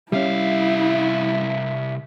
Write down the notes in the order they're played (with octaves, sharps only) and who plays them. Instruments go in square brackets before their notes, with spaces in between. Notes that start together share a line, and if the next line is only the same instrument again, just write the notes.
[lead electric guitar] C2 F5 [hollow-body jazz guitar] G3 C#4 [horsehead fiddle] E4 [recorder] E5